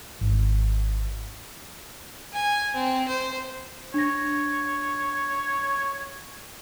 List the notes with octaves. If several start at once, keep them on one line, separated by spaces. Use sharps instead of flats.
G#1
G#5
C4
C5
D4 C#5 A#6